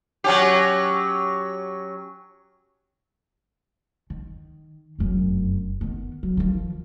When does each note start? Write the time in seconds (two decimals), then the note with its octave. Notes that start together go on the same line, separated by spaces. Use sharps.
0.24 F#3 C#4 G4
4.10 D#3
4.99 F1 F#2
5.81 D#3 B3
6.23 F#3
6.37 D#3 F3